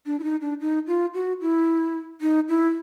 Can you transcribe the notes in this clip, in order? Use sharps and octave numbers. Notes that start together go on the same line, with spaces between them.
D4
E4
D#4
D4
D#4
F4
F#4
E4
D#4
E4